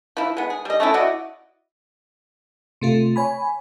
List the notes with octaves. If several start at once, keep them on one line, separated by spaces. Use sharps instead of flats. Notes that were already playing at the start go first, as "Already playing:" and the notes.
F3 E4
G#3 B3
G#4
G3 D#5
A3 C#4 E4
E4 F#4 D5 D#5
C3 A3 F4
C#5 G#5 B5